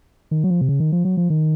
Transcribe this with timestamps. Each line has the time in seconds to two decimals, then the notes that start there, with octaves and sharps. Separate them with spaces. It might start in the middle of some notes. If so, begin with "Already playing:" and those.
0.31 D#3
0.44 F#3
0.50 F3
0.61 C3
0.69 C#3
0.80 D#3
0.92 F3
1.05 F#3
1.17 F3
1.30 D#3